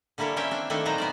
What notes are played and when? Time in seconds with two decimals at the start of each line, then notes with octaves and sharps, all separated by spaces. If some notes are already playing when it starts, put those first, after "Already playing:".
0.18 D3 G3 A#3 E4 A4 C#5
0.36 A#3 C4 C#4 C#5 E5 G5
0.51 C4 D4
0.70 D#3 A3 A#3 D4 E4 A4
0.85 A#2 D#3 F#3 D#4 C5 A#5
0.98 B3 A#4 D5